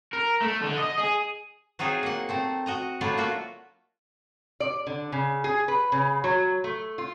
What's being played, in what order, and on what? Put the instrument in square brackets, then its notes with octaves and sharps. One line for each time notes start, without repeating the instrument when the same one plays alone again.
[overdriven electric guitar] A#4
A3
D3
D#5
G#4
[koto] F#3 C4 D#4 F4 G#4
A#3 F#5
A3 C4 C5
F#4 D#5 A#5
F#3 A3 D4 E4 F4
A#3 F4 F#4 E5
[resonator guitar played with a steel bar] D5
D3
C#3
G#4
B4
C#3
F#3
A3
F4